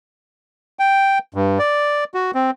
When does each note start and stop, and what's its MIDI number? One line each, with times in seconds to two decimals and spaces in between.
0.79 1.19 79
1.34 1.59 43
1.59 2.04 74
2.14 2.31 66
2.35 2.51 60